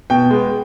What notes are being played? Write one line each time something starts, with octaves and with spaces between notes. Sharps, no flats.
B2 G5
G#3 B3